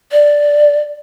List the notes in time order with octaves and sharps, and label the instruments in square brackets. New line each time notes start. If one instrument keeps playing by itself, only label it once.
[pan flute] D5